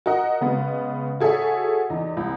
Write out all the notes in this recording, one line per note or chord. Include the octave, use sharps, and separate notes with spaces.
F#4 A#4 D#5 F#5
C#3 G#3 B3
F#4 G#4 A4 C#5 E5
E2 D#4
C2